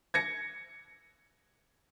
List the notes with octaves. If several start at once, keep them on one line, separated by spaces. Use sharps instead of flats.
G#6 A#6 C#7